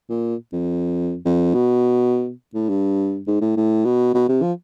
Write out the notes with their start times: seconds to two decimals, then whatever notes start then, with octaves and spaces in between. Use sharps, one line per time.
0.09 A#2
0.52 F2
1.25 F2
1.54 B2
2.54 A2
2.69 G2
3.27 G#2
3.41 A2
3.57 A2
3.85 B2
4.14 B2
4.28 C3
4.42 F3